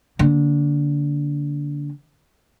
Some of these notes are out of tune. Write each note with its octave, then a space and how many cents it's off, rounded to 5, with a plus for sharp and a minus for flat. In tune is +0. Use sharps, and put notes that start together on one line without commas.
D3 -15 A#3 +0